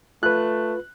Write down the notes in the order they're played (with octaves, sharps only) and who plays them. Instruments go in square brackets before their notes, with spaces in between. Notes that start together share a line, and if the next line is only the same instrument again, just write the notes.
[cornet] A3 [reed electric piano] F4 B4 [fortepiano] F#6